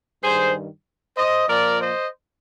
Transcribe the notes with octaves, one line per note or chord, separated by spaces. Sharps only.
G2 D#3 G#4 C5
C5 D#5
A#2 F3 A#4 D5
C5 D#5